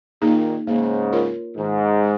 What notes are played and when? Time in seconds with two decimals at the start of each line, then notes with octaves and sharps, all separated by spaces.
0.22 A#2 D#3 A#3 D#4 G#4
0.67 G#2 C#3 A#3
1.12 F4 A#4 C#5
1.57 G#2 D#3
2.03 G#3